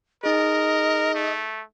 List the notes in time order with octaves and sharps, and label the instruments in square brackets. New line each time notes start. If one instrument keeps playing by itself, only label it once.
[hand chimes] D#4 G#4 [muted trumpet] A#4 [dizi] D#5
[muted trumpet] A3